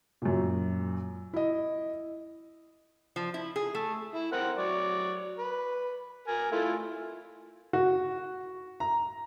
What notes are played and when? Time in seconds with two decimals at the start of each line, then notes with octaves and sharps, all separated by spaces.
0.22 F#2 A#2
1.33 E4 D#5
3.16 F3
3.34 E4
3.56 G#4
3.75 A3
4.14 E4
4.32 C4 A#4 F#5
4.58 F#3 D5 C#6
5.38 B4
6.27 A#4 G#5
6.52 A3 E4 F4
7.73 F#4
8.80 A#5